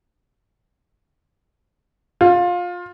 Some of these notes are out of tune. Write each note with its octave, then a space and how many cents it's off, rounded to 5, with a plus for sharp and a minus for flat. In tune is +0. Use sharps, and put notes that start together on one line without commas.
F4 +20